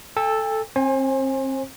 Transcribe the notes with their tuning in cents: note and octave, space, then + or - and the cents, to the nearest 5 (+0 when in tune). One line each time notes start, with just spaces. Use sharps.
A4 +0 G5 +45
C4 +30 C5 +35 G#5 -10